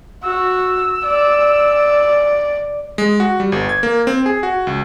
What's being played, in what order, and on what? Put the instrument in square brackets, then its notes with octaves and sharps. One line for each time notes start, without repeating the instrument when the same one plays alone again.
[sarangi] F#4 [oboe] E6
[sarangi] D5
[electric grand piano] G#3
F#4
G3
G1
G#6
A#3
C4
G#4
F#4
C#2